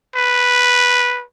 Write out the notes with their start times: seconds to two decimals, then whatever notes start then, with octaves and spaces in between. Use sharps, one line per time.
0.15 B4